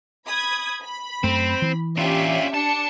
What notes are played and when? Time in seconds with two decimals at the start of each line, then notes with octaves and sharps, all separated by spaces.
0.27 B5 D#6 G#6
0.83 B5
1.24 F#2 A3 C4
1.62 E3
1.97 C#4 D4 F4 G4 E5
2.54 D4 A5 C#7